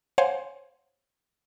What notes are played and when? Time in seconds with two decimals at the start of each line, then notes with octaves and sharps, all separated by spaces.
0.18 C5 C#5 F5 F#5 G#5 C6